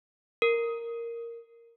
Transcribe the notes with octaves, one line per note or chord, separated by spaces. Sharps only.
A#4